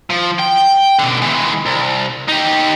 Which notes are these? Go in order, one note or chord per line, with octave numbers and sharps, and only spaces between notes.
F3
G5
B2 D3
E3 G#3
C2
D#4 G4